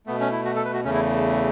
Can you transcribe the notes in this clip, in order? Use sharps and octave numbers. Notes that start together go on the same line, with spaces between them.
B2 A3 B3
C#4
E4
F#4
A4
B4
F#4
E2 C#3 A3 C#4
E4